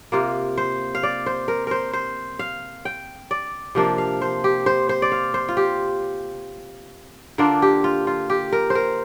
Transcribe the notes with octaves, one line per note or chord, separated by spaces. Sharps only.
C3 A#3 F4
C5
F5
D5
C5
A#4
A#4 C5
C5
F5
G5
D5
C3 F3 A#3 D4
F5
C5
G4
C5
C5
D5
F5
C5
F4
G4
D3 A#3 D4 F4
G4
F4
F4
G4
A#4
C5
A#4